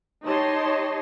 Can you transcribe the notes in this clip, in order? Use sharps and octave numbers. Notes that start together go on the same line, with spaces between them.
D#4 G4 C#5 D#5 A5 C6